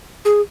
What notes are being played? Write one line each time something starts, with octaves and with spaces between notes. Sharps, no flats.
G#4